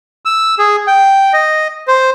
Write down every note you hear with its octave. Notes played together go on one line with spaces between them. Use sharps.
E6
G#4
G5
D#5
C5